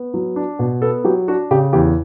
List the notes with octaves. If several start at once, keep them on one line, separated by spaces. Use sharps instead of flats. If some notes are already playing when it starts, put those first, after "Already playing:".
Already playing: B3
F#3
D4
B2
B3 A4
F#3 G4
D4 F#4
C#3 G4
E2 G4